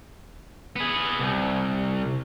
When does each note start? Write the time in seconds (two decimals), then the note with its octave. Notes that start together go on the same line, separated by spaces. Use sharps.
0.76 B3 G#4
1.20 C2